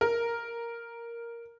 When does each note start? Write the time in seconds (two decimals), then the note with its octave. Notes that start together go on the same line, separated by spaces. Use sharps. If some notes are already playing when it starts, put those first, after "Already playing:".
0.01 A#4